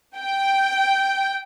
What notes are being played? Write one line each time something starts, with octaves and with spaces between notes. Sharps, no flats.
G5